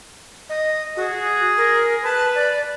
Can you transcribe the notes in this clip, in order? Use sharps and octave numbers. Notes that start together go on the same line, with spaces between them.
D#5
F#4 G#4
A#4
B4 A5
D5